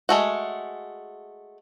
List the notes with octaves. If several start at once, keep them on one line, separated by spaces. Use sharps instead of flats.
G#3 A3 F#4